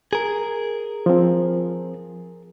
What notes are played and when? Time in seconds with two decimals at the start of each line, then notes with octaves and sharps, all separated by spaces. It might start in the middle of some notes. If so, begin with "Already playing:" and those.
0.13 G#4 A#4
1.06 F3 C4